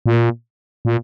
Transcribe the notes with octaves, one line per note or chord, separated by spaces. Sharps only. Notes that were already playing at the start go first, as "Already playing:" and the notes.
A#2
A#2